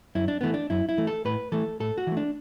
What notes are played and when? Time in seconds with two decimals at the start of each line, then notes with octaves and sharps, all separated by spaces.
0.15 F#2 E4
0.28 D4
0.41 E3 A3 B3
0.54 D4
0.70 F#2 E4
0.89 E4
0.98 E3 A3
1.07 A4
1.25 A2 B4
1.52 E3 A3 A4
1.80 A2 A4
1.98 F#4
2.07 E3 A3
2.17 D4